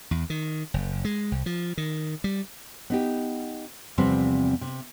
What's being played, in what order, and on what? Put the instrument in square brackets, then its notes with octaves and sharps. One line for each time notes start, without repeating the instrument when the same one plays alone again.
[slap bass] E2
D#3
F#1
G#3
C2
F3
D#3
G3
[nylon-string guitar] B3 D#4 G4
E2 C3 F3 G3 C4 B4
C3